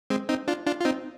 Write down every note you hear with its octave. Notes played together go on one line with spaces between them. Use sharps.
G#3 C4
C4 D#4
D4 F4
D4 F4
F4
C4 D#4